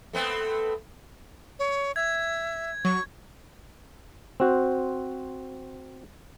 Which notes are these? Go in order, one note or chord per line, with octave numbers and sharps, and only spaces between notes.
A3 B3 C4
C#5
E5 G#6
F#3 C#6
C4 F#4 C5